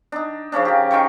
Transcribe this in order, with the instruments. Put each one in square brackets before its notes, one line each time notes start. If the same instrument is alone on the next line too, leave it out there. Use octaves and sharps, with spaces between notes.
[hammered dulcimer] D4 D#4
C#3 F3 C#4 D4
G4 A#4
D#3 F4 G5 C#6